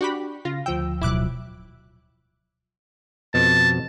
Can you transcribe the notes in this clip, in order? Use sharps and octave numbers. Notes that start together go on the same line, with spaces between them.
D4 F#4 G4 B5
C#3 F4 A#6
D2 F3 G5 E6
D1 B2 F#3 E4 D6 F#6
F2 B2 A5